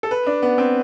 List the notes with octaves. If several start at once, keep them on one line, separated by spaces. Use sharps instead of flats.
A4
B4
D4
B3
C4